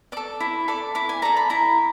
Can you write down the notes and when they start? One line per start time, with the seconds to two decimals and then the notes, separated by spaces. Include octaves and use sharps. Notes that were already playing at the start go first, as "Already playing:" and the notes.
0.12 A4 D5 D6
0.40 E4
0.68 A4 D5 D6
0.95 E4 D6
1.09 G#5
1.22 A4 D5 A#5
1.37 B5
1.50 E4 A#5